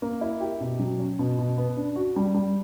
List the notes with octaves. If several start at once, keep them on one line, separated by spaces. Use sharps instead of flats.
A#3
E4
G4
B2
F#3
C#4
B2
B2
B3
D4
F#4
G3
G3